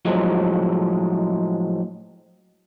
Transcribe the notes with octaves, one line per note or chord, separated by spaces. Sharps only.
A2 F3 F#3 G#3